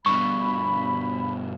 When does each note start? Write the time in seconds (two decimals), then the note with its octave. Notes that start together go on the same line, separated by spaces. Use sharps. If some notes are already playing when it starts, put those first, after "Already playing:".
0.06 G2 B2 B5 C#6